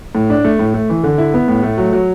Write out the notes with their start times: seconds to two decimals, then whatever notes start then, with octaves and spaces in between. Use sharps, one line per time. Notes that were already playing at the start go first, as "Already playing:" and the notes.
0.15 A2
0.30 D4
0.44 A3
0.59 A2
0.74 A3
0.89 E3
1.03 D3
1.18 E4
1.34 B3
1.48 A2
1.63 A3
1.78 F#3
1.93 F#3